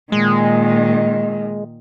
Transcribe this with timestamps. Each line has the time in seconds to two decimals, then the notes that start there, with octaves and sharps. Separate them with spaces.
0.12 A#2 D#3 G#3